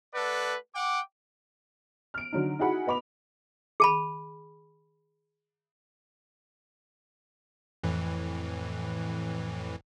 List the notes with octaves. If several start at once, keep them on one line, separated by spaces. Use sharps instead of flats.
A3 A4 B4 D5 F#5
F#5 G5 D6
F6 D7
D3 F#3 D#4
D#4 E4 F#4 G#4 F#5 B5
B4 D#5 B5 D6 F7
G#4 A5 B5
F2 A2 E3